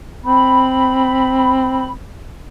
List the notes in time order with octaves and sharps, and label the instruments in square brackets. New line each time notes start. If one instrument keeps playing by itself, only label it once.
[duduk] C4 [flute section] B5